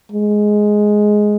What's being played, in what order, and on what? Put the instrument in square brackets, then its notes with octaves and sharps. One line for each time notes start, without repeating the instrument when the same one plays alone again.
[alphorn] G#3